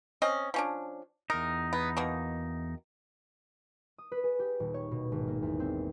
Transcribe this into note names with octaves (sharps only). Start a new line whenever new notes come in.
C4 C#4 D#5
F3 C#4 D4
E2 D#4 A#4
B3
B2 D#3 A#3
D#6
B4
G#4
G4
D#1
C#5
B2
G#1
A#3
E2
C4